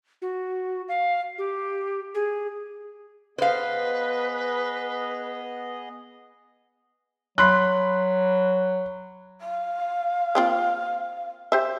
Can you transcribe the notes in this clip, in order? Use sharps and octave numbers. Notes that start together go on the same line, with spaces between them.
F#4
F5
G4
G#4
B3 G#4 B4 C5 D#5 F5
F#3 B5 C6 F#6
F5
A#3 C4 F4
G4 C5 E5